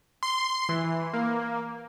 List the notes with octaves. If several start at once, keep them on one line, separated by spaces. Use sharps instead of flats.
C6
E3
A#3